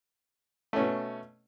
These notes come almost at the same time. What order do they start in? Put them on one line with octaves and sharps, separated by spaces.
A3 C#4 B2